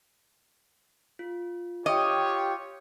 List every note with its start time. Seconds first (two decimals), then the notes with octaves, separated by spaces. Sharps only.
1.19 F4
1.86 F4 G4 C#5 D#5 G5 D6